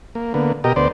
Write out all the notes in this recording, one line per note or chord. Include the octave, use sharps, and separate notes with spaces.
A#3
D3 A#3 B3
B2 G4 A#4 D#5
D2 B3 C5 D5